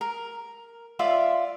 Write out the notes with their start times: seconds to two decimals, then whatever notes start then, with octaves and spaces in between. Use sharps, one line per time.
0.01 A#4
0.99 F4 D5 E5 C6